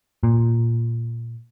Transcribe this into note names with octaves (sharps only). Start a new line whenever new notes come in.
A#2